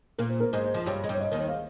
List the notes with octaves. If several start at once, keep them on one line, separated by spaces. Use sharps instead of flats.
A#2 A#3 A#4
C5
A#4
G#2 G#3 C5
F3
G2 G3 C#5
G#3
G2 G3
C#5
D#5
D#2 D#3
F5